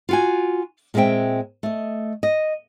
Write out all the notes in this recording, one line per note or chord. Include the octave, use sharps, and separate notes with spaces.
F4 F#4 G#5
A#2 G#3 B3 C4 E5 G5
A3 D#5
D#5